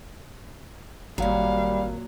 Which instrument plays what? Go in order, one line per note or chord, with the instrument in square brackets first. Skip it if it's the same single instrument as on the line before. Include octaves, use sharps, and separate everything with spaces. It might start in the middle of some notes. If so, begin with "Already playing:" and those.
[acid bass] G#1 [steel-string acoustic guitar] A#2 F#3 [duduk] G3 [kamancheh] F5